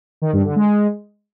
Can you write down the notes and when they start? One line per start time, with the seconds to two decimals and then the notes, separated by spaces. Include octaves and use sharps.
0.22 D#3
0.33 G2
0.44 D3
0.56 G#3